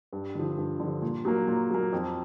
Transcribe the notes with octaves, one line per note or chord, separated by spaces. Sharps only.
G2
D3 F3
G2
D3 F3
A#2
F#3 A#3
A#2
F#3 A#3
F2